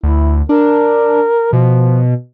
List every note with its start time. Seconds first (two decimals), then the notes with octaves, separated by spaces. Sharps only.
0.03 D2 E4
0.49 D4 A#4
1.53 B2 F3